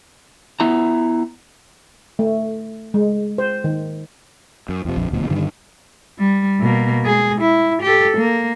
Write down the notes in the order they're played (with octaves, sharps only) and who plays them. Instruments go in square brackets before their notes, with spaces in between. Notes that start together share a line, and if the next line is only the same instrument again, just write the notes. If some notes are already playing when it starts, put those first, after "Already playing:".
[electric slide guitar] B3 E4 A#5
[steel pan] A3
G#3
C5
D#3
[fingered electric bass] F#2
F2 C3
A#1 F2
D#1 D2 B2 F3
G2 D3 D#3 G3
[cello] G3
B2 A#3
G#3 G#4
E4
G4 A4
A#3